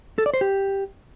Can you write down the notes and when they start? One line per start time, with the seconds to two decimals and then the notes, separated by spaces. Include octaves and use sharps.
0.18 A4
0.26 D5
0.34 C5
0.41 G4